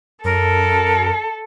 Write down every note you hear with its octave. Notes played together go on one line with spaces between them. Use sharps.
F#2 A4 A#4